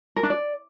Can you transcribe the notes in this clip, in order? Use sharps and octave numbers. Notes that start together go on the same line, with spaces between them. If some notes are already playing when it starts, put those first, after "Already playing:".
A#4
D4
D5